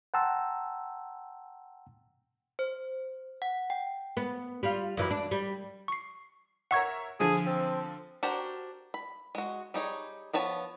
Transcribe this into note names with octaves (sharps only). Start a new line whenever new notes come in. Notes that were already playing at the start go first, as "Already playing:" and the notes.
F#5 G5 A5 A#5 C6 E6
C5
F#5
G5
B3
G3 F4
F#2 E3 E4
D4
G3
C#6 C7
A#4 C#5 E5 F#5 C#6 G#6
D3 F3 G#4
C4
D4 F#4 G4 A#4 C5
B5
G#3 F#4
G3 D#4 G#4 C#5
F3 B3 C#5 A5